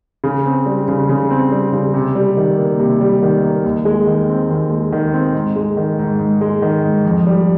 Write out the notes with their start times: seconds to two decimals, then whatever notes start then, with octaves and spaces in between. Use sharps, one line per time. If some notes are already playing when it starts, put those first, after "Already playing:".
0.24 C#3
0.46 C4
0.66 G3
0.88 C#3
1.09 C#3
1.30 C4
1.52 G3
1.73 C#3
1.94 C3
2.15 G3
2.37 D#3
2.58 A#3
2.80 C3
3.01 G3
3.23 D#3
3.43 A#3
3.64 D#2
3.85 G#3
4.07 D#3
4.29 C4
4.50 D#2
4.71 G#3
4.92 D#3
5.13 C4
5.34 G#2
5.56 G#3
5.77 D#3
5.99 G#2
6.19 G#2
6.41 G#3
6.62 D#3
6.84 G#2
7.05 F2
7.27 G3